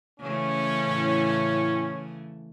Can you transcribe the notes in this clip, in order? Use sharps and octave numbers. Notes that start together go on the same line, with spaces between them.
C#3 E3 A3 C#4
A2